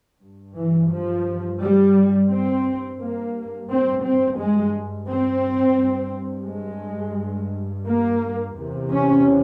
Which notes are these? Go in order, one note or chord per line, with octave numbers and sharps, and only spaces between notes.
G2
E3
F3
G3
C4
G2 A#3
C4
C4
G#3
C4
G2
G#3
A#3
E2 C3
C#4